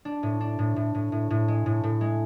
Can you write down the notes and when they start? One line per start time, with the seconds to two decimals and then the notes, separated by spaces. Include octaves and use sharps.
0.05 D4
0.23 A2
0.41 D4
0.59 A2
0.76 A2
0.95 A2
1.12 A2
1.30 A2
1.48 G#3
1.66 A2
1.83 A2
2.01 G#3